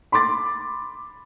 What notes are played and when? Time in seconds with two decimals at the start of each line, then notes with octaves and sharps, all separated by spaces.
0.12 B5 C6 D6 A6